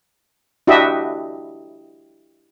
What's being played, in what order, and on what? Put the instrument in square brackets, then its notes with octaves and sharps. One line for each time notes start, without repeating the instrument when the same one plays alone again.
[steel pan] D4 E4 F#4 G4 D#5 E5